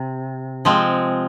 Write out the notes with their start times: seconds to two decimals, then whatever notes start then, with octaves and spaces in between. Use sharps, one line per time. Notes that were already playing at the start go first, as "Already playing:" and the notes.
Already playing: C3
0.65 F3 G#3 C4